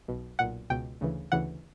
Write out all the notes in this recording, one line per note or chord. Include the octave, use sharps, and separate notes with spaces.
B1 B2
B1 A#2 F#5
C#2 B2 G5
D2 C#3 E3
D2 C#3 E3 F#5